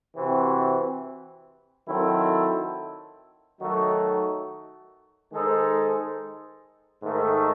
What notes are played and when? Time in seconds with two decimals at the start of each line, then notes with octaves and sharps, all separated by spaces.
0.15 C3 E3 C4 F#4
1.87 D#3 F#3 C4 E4 A4
3.60 D#3 F#3 A3 D#4 F#4
5.32 D#3 G#3 D#4 A4 C5
7.03 G#2 D#3 A3